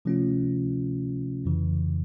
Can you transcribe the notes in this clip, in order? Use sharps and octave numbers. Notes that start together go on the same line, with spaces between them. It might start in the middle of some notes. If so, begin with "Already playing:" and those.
C3 F3 A3 C#4 F4
F2 C#3 E3